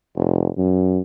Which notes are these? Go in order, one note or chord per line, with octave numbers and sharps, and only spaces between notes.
F1
F#2